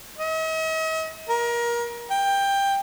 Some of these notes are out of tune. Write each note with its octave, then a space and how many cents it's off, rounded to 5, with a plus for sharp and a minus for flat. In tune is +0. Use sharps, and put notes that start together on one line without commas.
D#5 +45
A#4 +25
G5 +15